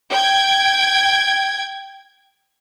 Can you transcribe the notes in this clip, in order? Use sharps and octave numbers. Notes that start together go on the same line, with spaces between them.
G5 G#6